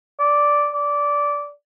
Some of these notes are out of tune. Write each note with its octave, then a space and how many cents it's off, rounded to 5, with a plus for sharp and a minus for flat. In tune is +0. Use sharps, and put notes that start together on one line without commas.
D5 -5
D5 -15